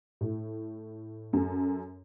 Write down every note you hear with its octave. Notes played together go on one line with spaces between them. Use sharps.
A2
F#2 A4